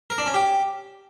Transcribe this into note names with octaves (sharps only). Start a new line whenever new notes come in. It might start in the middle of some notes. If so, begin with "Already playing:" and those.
A#4
D4
C#4
G4